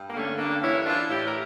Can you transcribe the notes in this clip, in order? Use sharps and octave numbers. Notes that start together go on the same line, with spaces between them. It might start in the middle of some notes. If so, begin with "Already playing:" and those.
Already playing: G2
A#3
D3 A3 C#4
G2 A#3 D4
E3 C#4 E4
E3 D4 F4
A2 E4 G4
A#4